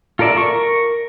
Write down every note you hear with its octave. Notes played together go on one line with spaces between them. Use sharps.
F4 A4 A#4 D5 E5
A#4 C#6